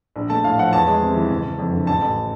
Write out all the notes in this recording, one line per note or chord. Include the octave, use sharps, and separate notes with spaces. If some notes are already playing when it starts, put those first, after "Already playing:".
A#1
A3 A5
A2 F5
F3 F#5
E2 A5
G#3
C3
E3
F#1
F#1
F2
D3
A1 A5
A1